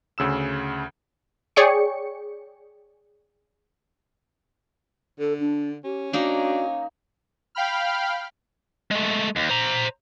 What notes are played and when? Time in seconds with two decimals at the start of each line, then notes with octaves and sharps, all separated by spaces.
0.18 D2 C#3 E6 E7
1.56 G#4 C#5 D5 G5 C#6 C#7
5.19 D3 A4
5.40 D4
5.84 C#4 G4
6.13 A#3 D4 D#4 F#4
7.55 F5 G5 B5 F6
8.91 G#3 A3
9.36 D#2
9.50 C5 A#5